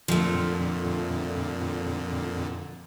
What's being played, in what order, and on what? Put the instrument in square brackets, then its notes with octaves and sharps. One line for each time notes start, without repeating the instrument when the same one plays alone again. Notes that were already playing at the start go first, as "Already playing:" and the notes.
[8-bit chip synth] F2 A#2 D3 [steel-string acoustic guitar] F3 A3